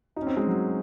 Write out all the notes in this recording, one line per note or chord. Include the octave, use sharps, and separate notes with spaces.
D#4
C#4
C4
G#3
F#3